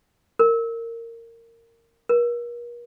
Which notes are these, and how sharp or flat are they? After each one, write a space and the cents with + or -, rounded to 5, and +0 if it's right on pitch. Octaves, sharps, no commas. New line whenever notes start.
A#4 -20
A#4 +40